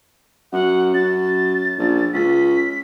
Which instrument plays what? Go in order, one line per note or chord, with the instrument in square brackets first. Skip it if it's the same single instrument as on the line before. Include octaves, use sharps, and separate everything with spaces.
[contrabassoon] F#2 [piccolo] F#5
[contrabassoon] F#2 [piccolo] A6
[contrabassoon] A#1
[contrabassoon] C#2 [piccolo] B6